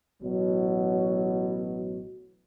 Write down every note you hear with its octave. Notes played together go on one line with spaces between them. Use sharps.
A1 B2 F#3